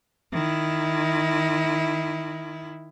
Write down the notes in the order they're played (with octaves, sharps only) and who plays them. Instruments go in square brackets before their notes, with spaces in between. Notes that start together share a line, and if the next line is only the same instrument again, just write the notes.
[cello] D#3 E4